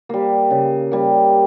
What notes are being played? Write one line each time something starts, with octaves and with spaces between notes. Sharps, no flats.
G3 A#3
C#3
G3 A#3